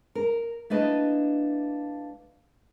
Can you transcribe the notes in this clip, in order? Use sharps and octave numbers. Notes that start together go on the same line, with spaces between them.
A#4
A3 A#3 D4 E4 B4 D#5